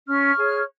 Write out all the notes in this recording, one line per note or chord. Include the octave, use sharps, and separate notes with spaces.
C#4 C#6 F6
G#4 C#5